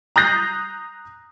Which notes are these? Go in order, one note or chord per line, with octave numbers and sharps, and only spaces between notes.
A#5 D#6 F#6 G6 A#6 C7